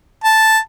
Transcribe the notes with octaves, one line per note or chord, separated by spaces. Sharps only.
A5